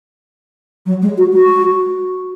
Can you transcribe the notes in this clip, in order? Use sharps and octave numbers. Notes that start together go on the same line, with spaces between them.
F#3
G#3
F#4
F#4